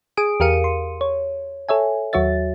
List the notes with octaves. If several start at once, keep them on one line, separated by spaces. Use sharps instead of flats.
G#4 G#5 D#6 D7
E2 G4 A#4 F5 C#7 D#7
C6
C#5
A4 C#5 E5 G#5
D#2 F#3 F#4 C#5 E5 A6